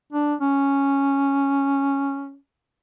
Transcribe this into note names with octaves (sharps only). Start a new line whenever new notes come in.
D4
C#4